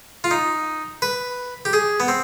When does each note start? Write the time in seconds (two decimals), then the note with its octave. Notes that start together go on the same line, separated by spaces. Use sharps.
0.24 F4
0.31 D#4
1.02 B4
1.65 G4
1.73 G#4
2.00 B3
2.08 C4